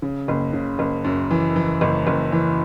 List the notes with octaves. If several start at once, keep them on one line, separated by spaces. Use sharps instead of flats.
C#3
F#1
C#3
F#1
F#2
E3
E3
F#1
F#1
E3